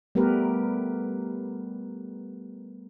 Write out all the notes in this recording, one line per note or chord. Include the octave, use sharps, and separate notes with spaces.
G3 A3 B3 G4 A#4 B4